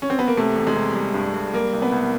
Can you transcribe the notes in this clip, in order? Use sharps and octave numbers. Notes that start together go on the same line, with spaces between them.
C#4
C4
B3
A#3
C3 A3
E2
G#3
C3
G3
G2
G3
G3 A#3
C2
B3
C2